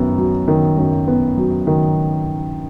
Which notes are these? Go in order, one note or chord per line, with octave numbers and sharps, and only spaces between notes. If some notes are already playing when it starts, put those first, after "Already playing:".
Already playing: F#2 D#3 B3
F#3
D#3
F#2
B3
F#3
D#3